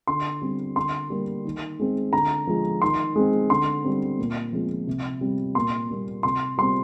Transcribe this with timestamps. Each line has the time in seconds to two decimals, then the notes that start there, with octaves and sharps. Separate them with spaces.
0.07 D3 C6
0.42 G3 C4
0.76 D3 C6
1.10 G3 A#3
1.45 D#3
1.79 G#3 C4
2.13 D3 A#5
2.47 F3 G#3
2.82 D#3 C6
3.16 G#3 C4
3.50 D3 C6
3.84 G3 C4
4.19 A#2
4.53 F3 G#3 C4
4.87 C3
5.21 G3 C4
5.55 A#2 C6
5.90 G3 A#3
6.23 C3 C6
6.58 G3 C4 C6